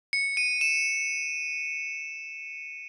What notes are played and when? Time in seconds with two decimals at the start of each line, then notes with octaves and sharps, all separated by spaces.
0.13 C#7
0.37 D#7
0.61 E7